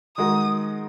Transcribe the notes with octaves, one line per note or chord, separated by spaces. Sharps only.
D#3 G#3 D#4 F#4 D#6